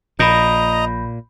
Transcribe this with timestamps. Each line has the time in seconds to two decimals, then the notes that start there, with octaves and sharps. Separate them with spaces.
0.19 A#1 A#2 D#5 A#5 B5 G6 A#6